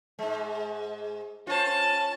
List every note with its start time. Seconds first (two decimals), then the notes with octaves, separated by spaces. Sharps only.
0.19 G#2 G#3
1.47 C#4 F4 C5 A5